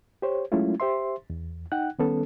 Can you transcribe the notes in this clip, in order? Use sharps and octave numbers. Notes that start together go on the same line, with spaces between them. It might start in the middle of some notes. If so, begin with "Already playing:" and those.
G4 C5 C#5
F#3 G#3 A3 C#4 E4 F4
G4 C5 E5 C6
E2
D#4 F#5 G5 F#6
D#3 G3 B3 C#4 A4